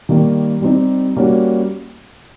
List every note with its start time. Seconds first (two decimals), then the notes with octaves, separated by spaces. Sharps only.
0.09 D#3 G3 A#3
0.62 G3 C4 D#4 G4
1.16 G3 A#3 C#4 F#4